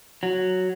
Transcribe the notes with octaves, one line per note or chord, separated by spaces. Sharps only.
F#3